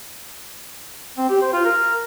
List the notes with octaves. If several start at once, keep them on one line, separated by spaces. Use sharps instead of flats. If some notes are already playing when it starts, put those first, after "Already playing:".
C4
G4
C5
F4
A#4